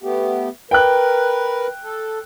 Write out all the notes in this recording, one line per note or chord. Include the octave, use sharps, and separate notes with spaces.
A3 B3 G4
A#4 B4 G5 F#6
A4